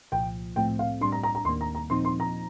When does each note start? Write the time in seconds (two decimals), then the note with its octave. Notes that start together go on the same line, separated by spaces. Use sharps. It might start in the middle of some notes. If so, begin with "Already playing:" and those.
0.12 C2 A#2 F3 G5
0.56 A2 F3 A3 C4 G5
0.79 F5
1.01 A2 G3 D4 C6
1.12 A#5
1.23 A#5
1.35 A#5
1.45 D#2 D#3 A#3 C6
1.61 A#5
1.75 A#5
1.90 A#2 F3 C4 D#4 C6
2.05 C6
2.20 A#5